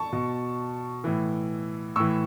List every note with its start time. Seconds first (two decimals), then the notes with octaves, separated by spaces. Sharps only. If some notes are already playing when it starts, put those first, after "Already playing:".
Already playing: A5 C#6
0.13 B2
1.04 A2 E3
1.96 A2 E3 C#6 E6